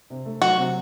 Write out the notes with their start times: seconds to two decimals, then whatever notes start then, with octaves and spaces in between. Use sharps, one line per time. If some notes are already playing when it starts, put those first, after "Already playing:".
0.10 C3
0.25 A3
0.42 F#3 F#4
0.58 C3